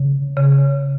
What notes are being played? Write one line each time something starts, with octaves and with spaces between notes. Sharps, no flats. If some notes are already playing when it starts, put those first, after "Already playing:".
Already playing: C#3
C#3